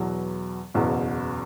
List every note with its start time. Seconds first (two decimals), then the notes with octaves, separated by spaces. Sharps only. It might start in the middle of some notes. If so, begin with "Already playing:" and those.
Already playing: E2 B2 F#3
0.74 F#1 E2 B2